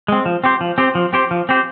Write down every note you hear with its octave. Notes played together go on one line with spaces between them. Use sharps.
G#3 C4
F3
C4 G4 C5
F3
C4 G4 C5
F3
C4 G4 C5
F3
C4 G4 C5